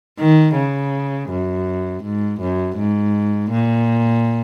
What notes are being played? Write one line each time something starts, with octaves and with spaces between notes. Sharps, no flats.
D#3
C#3
F#2
G#2
F#2
G#2
A#2